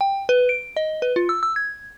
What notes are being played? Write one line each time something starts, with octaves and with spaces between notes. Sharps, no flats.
G5
B4
D7
D#5
B4
F4
E6
E6
G#6